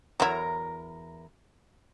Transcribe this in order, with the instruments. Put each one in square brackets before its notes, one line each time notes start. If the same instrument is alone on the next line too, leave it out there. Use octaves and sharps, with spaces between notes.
[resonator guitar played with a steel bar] E2 A#4 A#5 [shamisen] F#3 E4